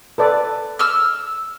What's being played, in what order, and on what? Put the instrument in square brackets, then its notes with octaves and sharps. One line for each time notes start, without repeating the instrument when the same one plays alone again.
[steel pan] A4 B4 D5
[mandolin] E6 F6